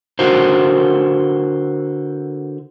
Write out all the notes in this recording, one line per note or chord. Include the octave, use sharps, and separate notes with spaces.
D3 E4 F#4 A#4 C5